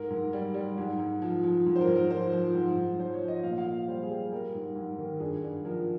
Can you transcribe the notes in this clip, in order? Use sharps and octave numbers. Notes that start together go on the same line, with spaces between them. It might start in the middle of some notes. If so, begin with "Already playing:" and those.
Already playing: G#2 A#4
G#2
G3
G3
G#2
G#2
F3
F3
G#2
C5
A#4
G#2
A#4
F3 C5
F3
G#2
G#2
F3 C5
C#5
F3
D#5
A#2 F5
F5
A#2
G3 C5
G#4
G3
G#4
G3 A#4
G#2
G#2
D#3
G2 G#4
G2
F3 A#4